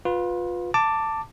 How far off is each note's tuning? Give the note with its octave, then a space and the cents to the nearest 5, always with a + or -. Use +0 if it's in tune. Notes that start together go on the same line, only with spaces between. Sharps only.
F4 +25 B4 +0
A5 +15 D6 +0